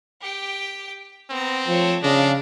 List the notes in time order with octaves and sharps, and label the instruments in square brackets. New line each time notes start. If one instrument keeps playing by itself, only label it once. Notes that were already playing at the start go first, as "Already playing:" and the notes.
[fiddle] G4 G5
[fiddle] B3 A#5 [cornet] C4
[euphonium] F3 [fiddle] A3 C#5
[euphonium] C#3 [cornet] D4 [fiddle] D#5 F5